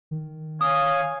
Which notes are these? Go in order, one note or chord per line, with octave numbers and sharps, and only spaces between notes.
D#3
C#5 F5 G#5 D#6